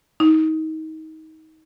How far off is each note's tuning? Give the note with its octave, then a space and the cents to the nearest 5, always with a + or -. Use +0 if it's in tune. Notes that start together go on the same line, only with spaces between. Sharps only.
D#4 +25